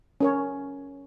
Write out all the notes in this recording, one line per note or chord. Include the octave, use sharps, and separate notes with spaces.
C#4 A#4 C#5